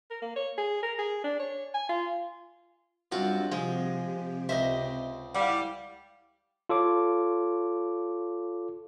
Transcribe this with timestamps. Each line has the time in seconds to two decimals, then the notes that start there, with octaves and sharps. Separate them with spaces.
0.11 A#4
0.22 A#3
0.36 C#5
0.58 G#4
0.83 A#4
0.98 G#4
1.24 D4
1.39 C#5
1.74 G#5
1.89 F4
3.12 F#2 G3 C4 D4 F4 F#4
3.52 C3 F3 G#3 G4
4.49 C#2 C5 D#5 E5
5.34 G3 E4 F5 F#5
6.69 F4 A4 C#5 D6